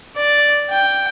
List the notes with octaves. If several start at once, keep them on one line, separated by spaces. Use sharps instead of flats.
D5
G5